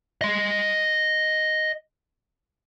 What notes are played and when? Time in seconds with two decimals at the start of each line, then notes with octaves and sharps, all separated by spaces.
0.21 D#5 C6